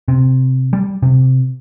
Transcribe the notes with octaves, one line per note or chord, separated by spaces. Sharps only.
C3
G3
C3